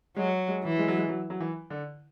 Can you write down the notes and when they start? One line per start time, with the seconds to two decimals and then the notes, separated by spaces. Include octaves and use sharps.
0.16 F#3 G#3
0.48 G#3
0.63 E3
0.79 G#3
0.88 F#3
0.97 G#3
1.09 F#3
1.30 F#3
1.40 E3
1.70 D3